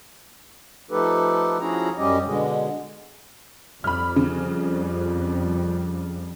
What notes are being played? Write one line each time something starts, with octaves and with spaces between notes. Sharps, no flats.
F3 A3 D#4 G4 A4 B4
F3 C#4 E4 F#4 G#4 A#5
F#2 G3 C#4 G4 D#5
B2 D3 G#3
F2 G3 B5 F6
C#3